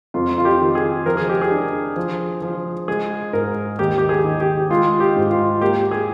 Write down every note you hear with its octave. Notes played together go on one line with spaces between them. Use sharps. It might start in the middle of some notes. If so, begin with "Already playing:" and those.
F2 F4
F4
G4
D#3
G#4
F3 A#4
G#4
G4
G#4
D4
F3
F3
G#3 G#4
G#2 A#4
D#2 G4
G4
G#4
D#3
G4
G#3 F4
G4
G#2
F4
A#3 G4
G#4